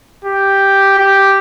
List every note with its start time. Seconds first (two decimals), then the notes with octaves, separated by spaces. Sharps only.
0.24 G4
0.98 G4